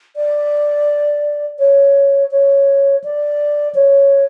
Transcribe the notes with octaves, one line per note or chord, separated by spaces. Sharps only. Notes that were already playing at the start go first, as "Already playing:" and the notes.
D5
C#5
C#5
D5
C#5